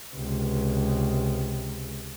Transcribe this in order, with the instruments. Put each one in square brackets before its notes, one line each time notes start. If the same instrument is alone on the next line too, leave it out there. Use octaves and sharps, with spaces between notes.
[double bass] C#2 C3